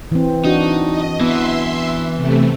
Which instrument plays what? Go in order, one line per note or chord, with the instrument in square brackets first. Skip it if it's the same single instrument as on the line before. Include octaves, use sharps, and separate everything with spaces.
[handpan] E3 C4
[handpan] D4 F#4 [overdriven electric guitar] D#4
[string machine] D#5
[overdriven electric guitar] E3 [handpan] B3 [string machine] E5 C6
[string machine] C3 A3